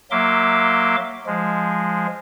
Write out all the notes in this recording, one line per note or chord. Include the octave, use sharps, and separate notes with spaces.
F#3 A#3 E5 C6 D6
F3 G#3